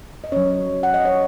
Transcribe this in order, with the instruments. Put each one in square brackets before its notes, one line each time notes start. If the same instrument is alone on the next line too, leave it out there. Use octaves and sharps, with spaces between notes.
[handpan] D#5
F#3 C#4 C#5
F#5
D#5
C#5